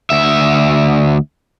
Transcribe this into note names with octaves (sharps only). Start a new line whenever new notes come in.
D2 E5